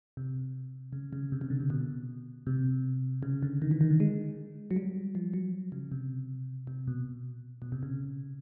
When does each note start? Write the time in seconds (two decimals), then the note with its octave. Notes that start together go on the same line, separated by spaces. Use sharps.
0.17 C3
0.93 C#3
1.13 C#3
1.32 C3
1.41 C#3
1.50 D3
1.60 C3
1.70 B2
2.47 C3
3.23 C#3
3.43 D3
3.62 D#3
3.71 E3
3.81 D#3
3.90 D3
4.00 G#3
4.71 F#3
4.76 G3
5.15 F3
5.34 F#3
5.72 C#3
5.92 C3
6.67 C3
6.88 B2
7.62 B2
7.72 C3
7.83 C#3